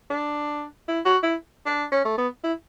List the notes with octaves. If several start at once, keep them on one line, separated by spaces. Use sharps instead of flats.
D4
E4
F#4
E4
D4
C#4
A3
B3
E4